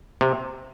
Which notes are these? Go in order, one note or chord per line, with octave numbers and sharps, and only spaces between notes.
C3